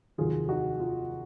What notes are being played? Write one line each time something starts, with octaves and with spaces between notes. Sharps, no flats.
F1 D#2 D#3 F#3 F4 G#4
D#4 F#4
F4